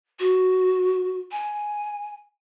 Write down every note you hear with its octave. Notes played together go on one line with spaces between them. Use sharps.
F#4
G#5